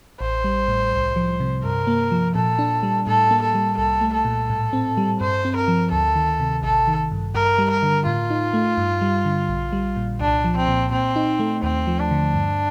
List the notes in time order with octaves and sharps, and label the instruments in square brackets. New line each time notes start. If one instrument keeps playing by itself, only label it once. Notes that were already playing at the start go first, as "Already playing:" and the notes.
[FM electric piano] A1 [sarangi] C5
[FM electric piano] G3
A2
C2
F3
C3
[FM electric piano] G2 [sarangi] A#4
[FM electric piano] A#3
F3
[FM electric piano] A#2 [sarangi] A4
[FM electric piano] D4
G3
[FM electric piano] A2 [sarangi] A4
[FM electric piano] A#3
[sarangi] A4
[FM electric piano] G3
[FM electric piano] C2 [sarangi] A4
[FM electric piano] A3
[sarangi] A4
[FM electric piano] A#2
A2
C4
G3
[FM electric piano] G2 [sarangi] C5
[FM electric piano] C4
[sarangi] A#4
[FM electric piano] F3
[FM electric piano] D2 [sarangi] A4
[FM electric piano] D#3
C3
[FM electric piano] A1 [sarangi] A4
[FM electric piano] D#3
G2
[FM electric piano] G2 [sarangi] A#4
[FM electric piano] G3
[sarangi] A#4
[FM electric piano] D3
[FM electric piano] A2 [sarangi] F4
[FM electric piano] D#4
A3
G2
G3
D3
A#1
G3
A#2
[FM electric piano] C2 [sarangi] D4
[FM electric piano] F3
[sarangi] C4
[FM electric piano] A#2
[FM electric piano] A#2 [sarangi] C4
[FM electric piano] D#4
A3
[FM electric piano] D#2 [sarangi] C4
[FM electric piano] F3
[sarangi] D4
[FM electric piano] D3
G2